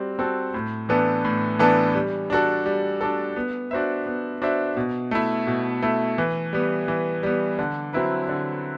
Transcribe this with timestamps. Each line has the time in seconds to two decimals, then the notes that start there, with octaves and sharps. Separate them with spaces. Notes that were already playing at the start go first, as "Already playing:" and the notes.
Already playing: G3 C4 F#4
0.19 C4 F#4 A4
0.54 A2
0.89 E3 B3 D4 A4
1.25 A2
1.59 E3 B3 D4 A4
1.95 G3
2.30 D4 F#4 A4
2.66 G3
3.01 D4 F#4 A4
3.36 B3
3.71 D4 F#4 C5 E5
4.06 B3
4.42 D4 F#4 C5 E5
4.77 B2
5.11 A3 E4
5.47 B2
5.82 A3 E4
6.18 E3
6.53 G3 B3
6.88 E3
7.23 G3 B3
7.59 D3
7.93 F#3 C4 E4 B4
8.29 D3